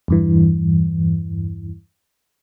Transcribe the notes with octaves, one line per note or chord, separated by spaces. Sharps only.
E2 G2 E3